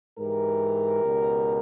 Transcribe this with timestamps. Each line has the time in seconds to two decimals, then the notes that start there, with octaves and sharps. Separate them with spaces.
0.18 G#2 E3 G4 A#4
1.04 C#2 B2